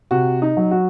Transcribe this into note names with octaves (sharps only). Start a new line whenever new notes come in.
C3 F#4
D#4
F#3
F#4